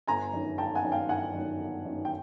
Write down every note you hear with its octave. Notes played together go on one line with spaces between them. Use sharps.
G1 G#5 A#5
F#2 D#3
G1 G5 A5
F#5 G#5
F#2 D#3
F5 G5
G1 F#5 G#5
F#2 D#3
G1
F#2 D#3
G5